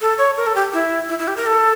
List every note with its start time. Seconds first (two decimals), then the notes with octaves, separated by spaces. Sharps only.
0.01 A4
0.18 C#5
0.37 A#4
0.47 A4
0.56 G4
0.73 E4
1.09 E4
1.19 E4
1.28 G4
1.37 A#4
1.46 A4